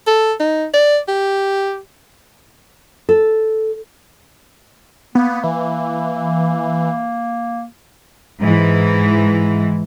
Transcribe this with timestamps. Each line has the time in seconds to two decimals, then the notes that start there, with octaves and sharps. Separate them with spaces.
0.07 A4
0.40 D#4
0.74 D5
1.08 G4
3.09 A4
5.15 A#3 B3
5.43 E3
8.41 G#2 E3